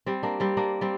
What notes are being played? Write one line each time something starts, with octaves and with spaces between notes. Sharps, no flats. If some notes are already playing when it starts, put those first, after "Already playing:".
G3 C4
A#3 D4
G3 C4
A#3 D4
G3 C4